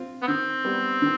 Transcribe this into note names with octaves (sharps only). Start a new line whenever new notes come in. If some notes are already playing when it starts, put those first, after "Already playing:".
Already playing: C4 F4
B3
D#3 C4
G3 B3
D#3